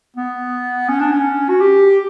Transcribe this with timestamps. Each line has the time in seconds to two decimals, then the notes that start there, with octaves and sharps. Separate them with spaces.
0.17 B3
0.89 C#4
1.00 D4
1.12 C#4
1.49 F#4
1.61 G4